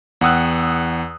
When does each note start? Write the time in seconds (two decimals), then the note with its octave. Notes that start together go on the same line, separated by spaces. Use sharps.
0.21 E2 F#5 G5 D#6 E6 F#6